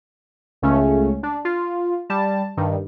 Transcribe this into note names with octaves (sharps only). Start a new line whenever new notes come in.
C#2 C#3 A3 C#4
D4
F4
G3 A5
G2 D#3